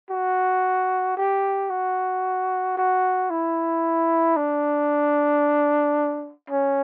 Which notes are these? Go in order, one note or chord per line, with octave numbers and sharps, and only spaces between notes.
F#4
G4
F#4
F#4
E4
D4
C#4